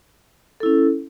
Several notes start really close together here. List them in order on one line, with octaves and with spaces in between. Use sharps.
A4 E4 C#4